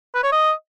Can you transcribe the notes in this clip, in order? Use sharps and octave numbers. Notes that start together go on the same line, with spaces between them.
B4
C#5
D#5